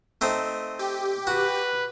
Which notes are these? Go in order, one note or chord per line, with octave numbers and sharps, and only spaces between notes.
A3 C4 D#4
G4
F#4 B4